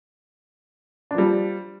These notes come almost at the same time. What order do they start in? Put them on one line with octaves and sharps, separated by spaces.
D4 F3 G3